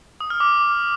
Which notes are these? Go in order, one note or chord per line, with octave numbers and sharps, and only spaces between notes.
D#6
F6
D6